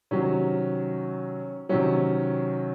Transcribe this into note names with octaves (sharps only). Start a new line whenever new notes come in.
C3 D#3 F#3 C#4
C3 D#3 F#3 C#4